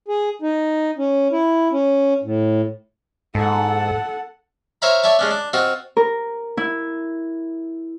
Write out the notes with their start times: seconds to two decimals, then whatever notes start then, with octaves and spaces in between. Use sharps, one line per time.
0.08 G#4
0.42 D#4
0.98 C#4
1.32 E4
1.72 C#4
2.24 A2
3.35 G#2 A4 F#5
4.82 C5 C#5 E5 F5 A#5 B5
5.03 C#5 D5 E5 A5
5.19 G#3 C#4 D4
5.31 D4
5.53 C4 F4 F#4 D#5
5.97 A#4
6.57 E4